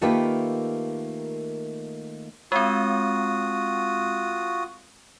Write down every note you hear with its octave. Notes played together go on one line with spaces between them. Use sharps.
D#3 A3 A#3 F4 G4 B4
G#3 C4 F4 F#4 D#6